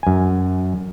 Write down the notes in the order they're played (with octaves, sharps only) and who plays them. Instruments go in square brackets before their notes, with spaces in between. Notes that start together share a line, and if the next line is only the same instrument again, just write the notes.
[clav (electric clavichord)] F#2 G#5